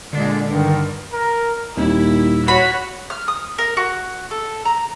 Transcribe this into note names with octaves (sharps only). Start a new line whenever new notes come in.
A#2 D3 G#3 D4
G2 D#3
A#4
D#1 D#2 G3 C4 E4
F#4 C#5 B5
F6
D#6
A#4
F#4
A4
A#5